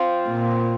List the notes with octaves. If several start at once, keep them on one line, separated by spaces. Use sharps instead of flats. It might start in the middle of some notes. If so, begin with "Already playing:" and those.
Already playing: C4 F4
A#2